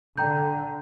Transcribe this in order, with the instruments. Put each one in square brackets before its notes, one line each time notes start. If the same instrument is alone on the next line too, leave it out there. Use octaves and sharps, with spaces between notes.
[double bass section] D3 [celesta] G5 A#5 G6